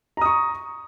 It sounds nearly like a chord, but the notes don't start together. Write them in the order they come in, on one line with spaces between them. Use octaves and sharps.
A#5 D#6 C#6